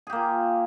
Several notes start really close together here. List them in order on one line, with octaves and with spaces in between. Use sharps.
G#4 G4 A#3 F4